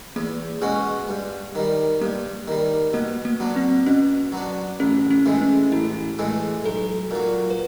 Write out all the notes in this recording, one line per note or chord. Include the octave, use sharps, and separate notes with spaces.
E2 A#3
B2 G#3 C#4 F#4
G2
D#3 G3
G2 A#3
D#3 G3
B2 A#3
A#3
F#3 B3 D4
C4
B2 C#4
F#3 B3 D4
A1 C#4
C#4
A2 E3 G#3
C#4
A1 E4
A2 E3 G#3
B1 A4
A#2 F#3
B4